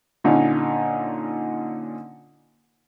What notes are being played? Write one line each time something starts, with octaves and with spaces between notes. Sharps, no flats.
A#2 D3 C#4 D#4